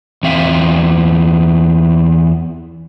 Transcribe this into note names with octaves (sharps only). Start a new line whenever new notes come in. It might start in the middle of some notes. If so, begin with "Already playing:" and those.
E2 C4 E5 F5